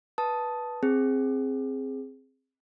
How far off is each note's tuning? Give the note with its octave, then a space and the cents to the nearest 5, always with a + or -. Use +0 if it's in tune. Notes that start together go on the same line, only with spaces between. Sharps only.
B4 -15 A5 +0 D#6 +5
C4 +10 G#4 +0